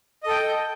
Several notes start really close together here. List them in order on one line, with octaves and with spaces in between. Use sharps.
D#5 A4 G5